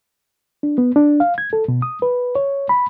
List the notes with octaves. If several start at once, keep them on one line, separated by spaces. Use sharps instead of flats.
D4
B3
D4
F5
G#6
A4
B2
D#6
B4
C#5
B5